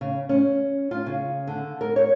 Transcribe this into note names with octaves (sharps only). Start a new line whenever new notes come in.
C#3
C#4
F4
C#3
D3
A#4
C#5